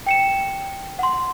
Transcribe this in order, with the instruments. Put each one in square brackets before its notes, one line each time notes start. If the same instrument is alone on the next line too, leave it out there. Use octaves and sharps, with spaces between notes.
[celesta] G5 C#7 E7
F#5 C6